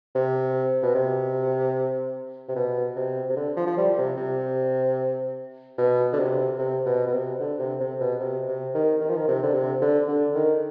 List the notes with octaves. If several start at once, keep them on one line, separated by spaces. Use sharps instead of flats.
C3
B2
C3
C3
B2
C3
C3
D3
F3
F3
G3
C3
C3
B2
D3
C3
C3
B2
B2
C3
D3
C3
C3
B2
C3
C3
D#3
D#3
F3
D#3
C3
D3
C3
D3
D3
D#3